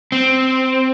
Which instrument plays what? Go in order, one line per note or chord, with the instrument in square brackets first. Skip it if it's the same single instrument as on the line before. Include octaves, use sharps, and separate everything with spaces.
[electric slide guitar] C4